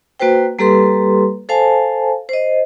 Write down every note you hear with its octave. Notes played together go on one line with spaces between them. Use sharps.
A#3 F#4 B4 C5 G5
G3 A#3 G4 A4 B4 C6
A4 C5 F5 G#5 A5
C5 D#5